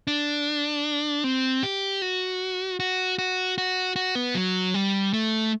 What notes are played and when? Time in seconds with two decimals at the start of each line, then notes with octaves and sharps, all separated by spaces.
0.07 D4
1.24 C4
1.63 G4
2.02 F#4
2.80 F#4
3.19 F#4
3.58 F#4
3.96 F#4
4.15 B3
4.35 F#3
4.74 G3
5.13 A3